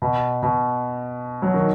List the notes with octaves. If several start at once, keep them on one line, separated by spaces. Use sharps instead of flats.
B2
B2
F#3
D#3